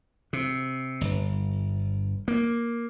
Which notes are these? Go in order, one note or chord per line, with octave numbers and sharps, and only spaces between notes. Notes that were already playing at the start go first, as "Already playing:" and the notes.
C3
G1
A#3